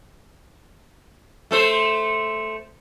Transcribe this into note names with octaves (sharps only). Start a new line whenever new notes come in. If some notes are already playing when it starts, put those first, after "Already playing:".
A3 A4 C5